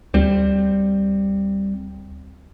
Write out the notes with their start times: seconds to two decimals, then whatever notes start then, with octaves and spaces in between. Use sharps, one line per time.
0.14 D2 G3 C4